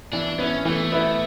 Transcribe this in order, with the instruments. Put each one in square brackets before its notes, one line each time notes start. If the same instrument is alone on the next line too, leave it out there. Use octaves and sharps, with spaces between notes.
[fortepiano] E3 [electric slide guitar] D4
[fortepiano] B3 E4 [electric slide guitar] C#4
[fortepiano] E3 [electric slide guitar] A3
[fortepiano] B3 E4